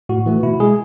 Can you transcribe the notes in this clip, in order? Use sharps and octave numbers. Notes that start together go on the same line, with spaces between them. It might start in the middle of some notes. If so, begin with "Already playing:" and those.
A2 F#4
E3 A3
B2 E4
G#3 G#4